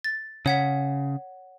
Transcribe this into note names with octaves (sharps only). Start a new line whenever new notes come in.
A6
C#3 C#5 F#5 B6